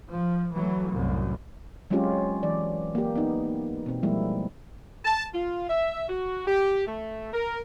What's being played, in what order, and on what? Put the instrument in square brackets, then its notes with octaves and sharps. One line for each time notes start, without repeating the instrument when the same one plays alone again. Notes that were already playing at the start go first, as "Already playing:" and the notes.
[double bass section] F3
E3 F#3 A3
C2 F#2 A2
[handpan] F#3 G#3 C4 C#4 F4 G4
E3 D5
A#3 G4
B3 D#4
B2 C4
F3 G3 G#3 A#3 E4
[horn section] A5
F4
E5
F#4
G4
A3
A#4